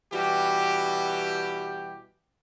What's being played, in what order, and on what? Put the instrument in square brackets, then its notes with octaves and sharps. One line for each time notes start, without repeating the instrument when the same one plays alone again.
[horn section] B2 E3 G3 F#4 G4